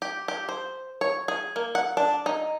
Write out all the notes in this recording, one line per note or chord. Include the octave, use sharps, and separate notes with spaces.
G4
G4
C5
C#5
G#4
A#3
F#5
D4
D#4